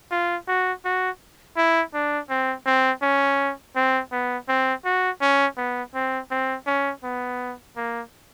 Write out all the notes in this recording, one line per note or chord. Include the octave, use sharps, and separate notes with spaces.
F4
F#4
F#4
E4
D4
C4
C4
C#4
C4
B3
C4
F#4
C#4
B3
C4
C4
C#4
B3
A#3